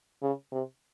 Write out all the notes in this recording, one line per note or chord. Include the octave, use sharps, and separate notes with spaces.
C#3
C3